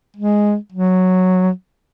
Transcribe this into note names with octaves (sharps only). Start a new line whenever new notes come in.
G#3
F#3